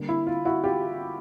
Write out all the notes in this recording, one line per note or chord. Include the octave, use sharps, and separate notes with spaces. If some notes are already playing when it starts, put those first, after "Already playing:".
Already playing: D3 G3 A#3
E4
F4
E4 F#4
F4 G4